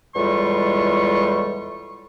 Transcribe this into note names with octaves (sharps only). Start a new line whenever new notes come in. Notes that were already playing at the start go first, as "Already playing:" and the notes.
E2 A2 G3 G#3 F4 C#6